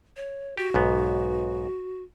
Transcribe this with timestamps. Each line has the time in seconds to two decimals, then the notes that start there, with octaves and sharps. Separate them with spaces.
0.16 C#5
0.57 F#4 G4
0.74 B1 G#2 B3